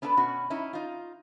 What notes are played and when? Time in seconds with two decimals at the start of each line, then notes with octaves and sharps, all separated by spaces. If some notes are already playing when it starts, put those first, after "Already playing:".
0.02 B3 C#4 D4 F#4 A4 B4
0.17 B2 C#4 F#4
0.50 C#4 D#4 E4
0.73 D#4 F4